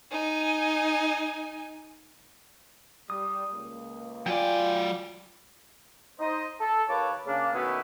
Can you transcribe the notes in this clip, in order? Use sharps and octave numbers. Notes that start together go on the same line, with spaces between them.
D#4 G#5
G3 D#6
C#2 A#3
F#3 F4 D5 G5 G#5
D#4 C5 D#5
A4
D#2 A#3 B4 C#5 A5 D6
C#3 A#3 D4
B2 D#3 A3 B3 C#4 E4